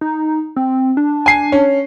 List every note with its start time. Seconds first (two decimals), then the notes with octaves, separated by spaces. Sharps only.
0.01 D#4
0.56 C4
0.97 D4
1.26 G#5 C7
1.52 C#4